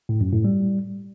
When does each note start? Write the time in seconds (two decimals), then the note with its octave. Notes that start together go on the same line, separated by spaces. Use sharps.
0.09 A2
0.21 F#2
0.33 A2
0.44 G3